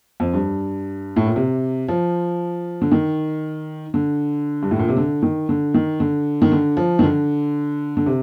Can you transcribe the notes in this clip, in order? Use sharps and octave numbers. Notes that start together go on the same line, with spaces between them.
F2
G2
A2
A#2
C3
F3
D3
D#3
D3
G2
A2
A#2
C3
D3
D#3
D3
D#3
D3
D#3
D3
F3
D#3
D3
D3
C3